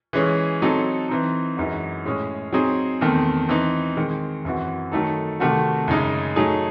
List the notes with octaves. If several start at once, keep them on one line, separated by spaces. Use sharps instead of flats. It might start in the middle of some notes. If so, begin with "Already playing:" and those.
E3 G#3 C#4 G#4
F#3 C4 D#4 A4
E3 C4 D#4
F#2 E3 G#3 D#4 F#4
A2 G#3 C#4 G#4
F#3 C4 D#4 G#4
E2 D#3 A3 C4
E3 C4 D#4
D#3 G#3 C4
F#2 E3 C4 F#4
D#3 F#3 A3 D#4 A4
C3 D#3 A3 C4 F#4
F#2 C#3 G#3 D#4 G#4
F#3 A3 D#4 G#4